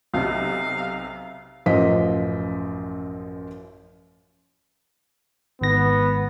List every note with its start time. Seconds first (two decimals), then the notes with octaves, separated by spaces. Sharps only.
0.14 B1 C3 F5
1.66 A1 F#2 F3 F4 D#5 B6
5.61 G#1 B3 A#6